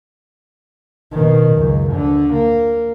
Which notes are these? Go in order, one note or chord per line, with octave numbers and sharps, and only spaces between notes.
B2 D#3
C#2 F#2
D2 D3
A#3